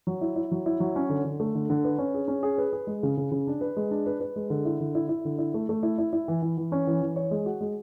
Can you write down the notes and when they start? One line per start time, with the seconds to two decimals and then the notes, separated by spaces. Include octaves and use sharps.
0.07 F#3
0.21 E4
0.36 E4
0.52 F#3
0.66 E4
0.80 F#3
0.96 C#4
1.10 D3
1.25 D3
1.40 A3
1.55 D3
1.70 D3
1.84 B4
1.98 C#4
2.14 G#4
2.28 C#4
2.43 G#4
2.58 B4
2.73 G#4
2.87 G#3
3.03 C#3
3.17 C#3
3.31 C#3
3.47 D4
3.61 B4
3.77 G#3
3.91 D4
4.06 B4
4.20 B4
4.36 G#3
4.50 D3
4.65 E4
4.80 D3
4.95 E4
5.09 E4
5.25 D3
5.39 E4
5.54 A3
5.69 A3
5.83 E4
5.98 E4
6.13 E4
6.28 E3
6.42 E3
6.57 E3
6.72 C#4
6.87 E3
7.01 E3
7.16 C#5
7.31 G#3
7.46 F#4
7.61 G#3